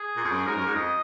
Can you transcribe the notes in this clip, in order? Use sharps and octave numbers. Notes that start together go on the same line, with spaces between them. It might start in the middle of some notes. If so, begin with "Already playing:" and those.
Already playing: G#4
A#2
F2
F#2
G#2 A#4
F#2
G#2
F2 D#5